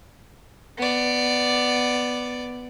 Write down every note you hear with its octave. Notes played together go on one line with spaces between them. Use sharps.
B3 D5